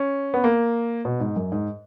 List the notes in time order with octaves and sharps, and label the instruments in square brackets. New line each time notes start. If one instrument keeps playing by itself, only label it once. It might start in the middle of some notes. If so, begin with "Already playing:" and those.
Already playing: [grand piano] C#4
B3
A#3
B2
G#2
F#2
G#2